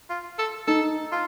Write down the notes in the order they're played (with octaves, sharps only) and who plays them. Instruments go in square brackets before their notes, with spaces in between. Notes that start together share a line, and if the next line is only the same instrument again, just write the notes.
[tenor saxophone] F4
A4
[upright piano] D#4 [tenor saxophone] A4
[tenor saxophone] F4